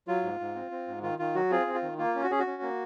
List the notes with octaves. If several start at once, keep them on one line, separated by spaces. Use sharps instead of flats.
F#3 F4
G#2
G#2
C4
C4
G#2
D#3 F4
D#3 F4
F#3 F#4
C4 F4 G#4
C4
F4
D#3
A#3 F4
C#4
F#4
C#4 G#4
F#4
C#4
A#3